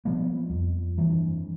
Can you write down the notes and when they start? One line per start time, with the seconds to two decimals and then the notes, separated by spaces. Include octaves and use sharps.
0.05 F3 G3 B3
0.50 F2
0.98 G2 E3